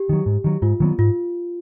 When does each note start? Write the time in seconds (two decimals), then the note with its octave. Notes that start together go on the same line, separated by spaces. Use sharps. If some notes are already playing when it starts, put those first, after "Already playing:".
Already playing: G4
0.09 D#3 F#3
0.26 G#2
0.44 D#3 F#3
0.62 G#2 F4
0.80 D#3 F#3 B3
0.99 G#2 F4